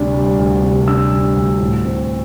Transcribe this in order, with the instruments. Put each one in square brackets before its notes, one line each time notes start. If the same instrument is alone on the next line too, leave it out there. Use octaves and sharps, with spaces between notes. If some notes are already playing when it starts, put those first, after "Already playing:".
Already playing: [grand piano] D2 C3 G3 D4
G3
D2
C3
D4 E6
G3
D2
A2
C4